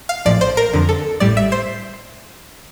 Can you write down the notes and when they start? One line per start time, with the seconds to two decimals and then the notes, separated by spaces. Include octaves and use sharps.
0.09 F5
0.25 A#1 A2 F3 D5
0.41 C5
0.57 A#4
0.73 F2 D3 F3
0.89 A4
1.20 A1 A2 G3 D5
1.37 E5
1.52 C5